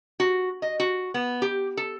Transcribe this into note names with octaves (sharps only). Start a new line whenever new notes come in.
F#4
D#5
F#4
B3
G4
A4